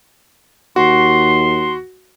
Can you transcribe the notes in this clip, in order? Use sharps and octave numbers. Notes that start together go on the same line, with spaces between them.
D#2 F#4 C6